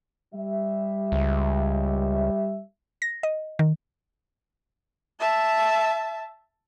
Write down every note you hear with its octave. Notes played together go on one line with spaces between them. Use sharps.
G3 E5
C#2
A#6
D#5
D#3
E5 A5